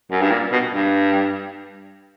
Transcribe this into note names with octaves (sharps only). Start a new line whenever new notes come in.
F#2
G2
A#2
B2
G2